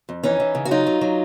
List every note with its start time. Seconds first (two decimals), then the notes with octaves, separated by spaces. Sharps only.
0.09 F2
0.24 E3 C#4 D#4
0.40 E3
0.55 C#3
0.65 F#4
0.71 F#3 D#4 F4
0.87 F#3
1.01 F#3